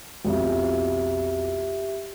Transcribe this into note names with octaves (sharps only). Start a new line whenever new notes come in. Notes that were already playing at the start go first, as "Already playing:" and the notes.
B1 F2 G4 E5